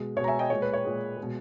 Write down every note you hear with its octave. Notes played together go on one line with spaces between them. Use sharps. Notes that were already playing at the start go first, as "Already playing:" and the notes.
Already playing: B2 G#3
B2 G#3 C#5
A#5
E5 G#5
D#5 G5
A#2 G#3 C#5
B4
C#5
A#2 G#3
G#3
B2